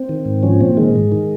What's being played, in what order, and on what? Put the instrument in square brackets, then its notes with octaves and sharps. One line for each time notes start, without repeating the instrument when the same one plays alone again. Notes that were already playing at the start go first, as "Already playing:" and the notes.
Already playing: [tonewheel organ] C4
D#3
G#2
F3 C#4
A#2 C4
D#3 G#3
G#2
D#3